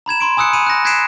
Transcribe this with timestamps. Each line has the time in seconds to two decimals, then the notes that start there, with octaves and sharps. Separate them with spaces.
0.06 A#5 B5 G#6 E7
0.20 B5 C6 D7
0.37 G#5 D#6 E6 F#6 C#7
0.53 G#5 B5 C#7 D#7
0.67 F#6 A#6
0.85 F#6 G#6 B6 C7 D7 E7